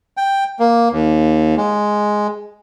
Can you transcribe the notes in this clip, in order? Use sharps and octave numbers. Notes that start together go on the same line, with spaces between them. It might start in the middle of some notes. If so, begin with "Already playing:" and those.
G5
A#3
D#2
G#3